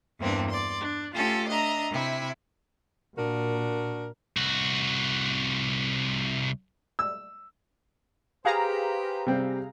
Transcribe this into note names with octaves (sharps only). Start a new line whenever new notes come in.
E2 G2 A#3 C4 D4
D5 C6
D4
A3 C#4 F4 G4 A4
D4 D#5 E5 A#5
C3 E4
A#2 D4 F#4 A#4
C2 F#4
E6
G4 G#4 B4 C5 F5 A#5
C3 G3 C4